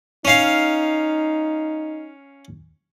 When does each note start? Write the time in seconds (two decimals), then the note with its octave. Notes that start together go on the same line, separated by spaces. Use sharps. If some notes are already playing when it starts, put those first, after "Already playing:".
0.25 C#4 D#4 F5